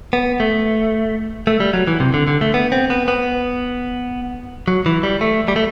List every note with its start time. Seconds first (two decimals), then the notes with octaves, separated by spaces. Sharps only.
0.13 B3
0.40 A3
1.47 A3
1.60 G3
1.73 F#3
1.87 E3
2.00 C3
2.14 D3
2.28 D3
2.41 A3
2.54 B3
2.72 C4
2.90 B3
3.08 B3
4.68 F#3
4.86 E3
5.03 G3
5.21 A3
5.48 G3
5.56 A3